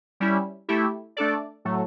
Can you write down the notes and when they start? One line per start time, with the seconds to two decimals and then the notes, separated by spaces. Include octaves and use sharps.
0.20 G3 C#4 E4
0.69 A3 E4 G4
1.17 A3 D4 A4 D5
1.65 A2 F#3 A3